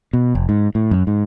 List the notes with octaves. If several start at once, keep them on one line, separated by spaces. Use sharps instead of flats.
B2
F1
G#2
A2
F#2
G#2